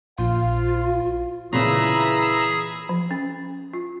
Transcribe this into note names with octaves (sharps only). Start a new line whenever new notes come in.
A#1 F4 C5 F5
A#2 C#3 E3 G#4 A#5 B5 E6
F3
C#4
F4